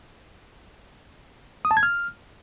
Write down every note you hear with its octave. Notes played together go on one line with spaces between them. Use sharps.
D#6
A5
G#6
F6